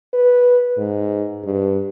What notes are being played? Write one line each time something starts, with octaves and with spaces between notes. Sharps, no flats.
B4
G#2
G2